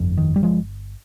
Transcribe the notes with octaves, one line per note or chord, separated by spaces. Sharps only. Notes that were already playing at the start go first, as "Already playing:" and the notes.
Already playing: G1 F2
D#3
G3
F3 G#3